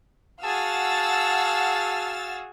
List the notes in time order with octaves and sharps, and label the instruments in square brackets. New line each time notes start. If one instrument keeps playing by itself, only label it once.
[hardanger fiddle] F#4 G#4 [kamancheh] F5 F#5 [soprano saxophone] A5 [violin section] E6 F6 A6